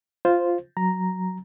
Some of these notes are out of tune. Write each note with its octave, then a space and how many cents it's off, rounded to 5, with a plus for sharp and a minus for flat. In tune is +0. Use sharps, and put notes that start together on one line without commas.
F4 +0 C5 +0
F#3 +0 A#5 +0